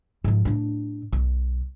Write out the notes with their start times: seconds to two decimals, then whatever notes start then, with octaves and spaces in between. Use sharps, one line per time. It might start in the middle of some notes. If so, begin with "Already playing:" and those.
0.24 G#2 F3
0.45 A2 D4
1.12 B1